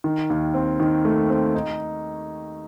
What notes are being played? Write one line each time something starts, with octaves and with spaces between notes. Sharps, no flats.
D#3
D#2
C4
D#3
A3
C4
D#4